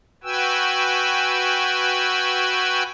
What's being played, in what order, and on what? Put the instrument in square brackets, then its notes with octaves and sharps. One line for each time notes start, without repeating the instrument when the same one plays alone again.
[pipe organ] F#4 B4 G5 G#5 E6